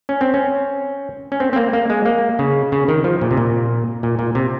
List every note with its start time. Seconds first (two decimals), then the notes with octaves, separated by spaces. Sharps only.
0.09 C#4
0.21 C4
0.34 C#4
1.32 C#4
1.40 C4
1.53 C4
1.56 A#3
1.73 A#3
1.90 G#3
2.05 A#3
2.39 C#3
2.72 C#3
2.88 D#3
3.04 F3
3.21 A#2
3.31 C3
3.37 A#2
4.03 A#2
4.19 A#2
4.35 C3